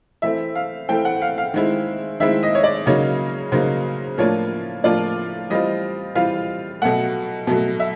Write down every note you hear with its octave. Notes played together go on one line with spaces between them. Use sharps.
E3 A3 C4 E5
F5
E3 A3 C4 G5
F#5
F5
F5
D#3 G#3 C4 E4
D#3 G#3 C4 E4 E5
D#5
C#5
D5
C#3 F#3 A#3 D#4 C#5
C#3 F#3 A#3 D#4 C5
A2 F3 A#3 D4 F4 C#5
A2 F3 A#3 D4 F4 D5
E3 G3 C4 F4 D#5
E3 G3 C4 F4 F5
B2 F#3 A3 F#5
B2 F#3 A3
E5